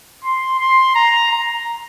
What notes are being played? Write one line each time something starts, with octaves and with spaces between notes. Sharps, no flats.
C6
C6
A#5
A#5